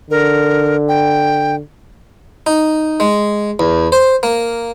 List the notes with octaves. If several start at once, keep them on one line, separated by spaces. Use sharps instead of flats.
D3 A#4
G5
D#4
G#3
E2
C5
A#3